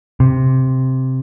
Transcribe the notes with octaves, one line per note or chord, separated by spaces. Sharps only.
C3